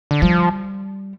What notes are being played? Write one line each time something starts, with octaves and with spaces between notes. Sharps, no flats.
D3
F3 G3